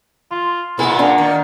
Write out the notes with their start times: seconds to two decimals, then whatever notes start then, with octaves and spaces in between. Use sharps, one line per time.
0.31 F4 C6
0.79 A#2 A#3 B3 E4 G#4
0.99 A#3 D4
1.18 D#3